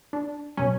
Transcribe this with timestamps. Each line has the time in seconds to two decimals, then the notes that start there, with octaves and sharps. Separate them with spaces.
0.13 D4
0.57 B2 F#3 C#4